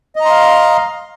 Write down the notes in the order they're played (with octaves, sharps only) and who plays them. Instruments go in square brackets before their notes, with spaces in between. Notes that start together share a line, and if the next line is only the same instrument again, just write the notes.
[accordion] D#5
A#5
C6
F5